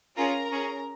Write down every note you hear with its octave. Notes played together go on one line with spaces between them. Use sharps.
C#4 F4 G#4 A#4 A#5
C#4 G#4